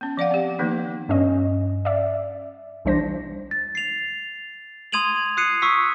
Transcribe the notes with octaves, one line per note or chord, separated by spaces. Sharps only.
B3 C#4
F3 D5 F5 F#5
C4 G4
D#3 F3 A#3 B3 D#4
G2 C#4 D#5
D5 E5
B1 E3 G3 D4 C5 A#6
A6
C7 F7
C6 D#6 G#6 D#7 F7 F#7
D#6 F#6 C7 C#7 D#7
C#6 D#6 E6 B6